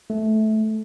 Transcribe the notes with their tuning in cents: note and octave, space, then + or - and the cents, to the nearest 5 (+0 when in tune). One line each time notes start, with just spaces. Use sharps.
A3 -15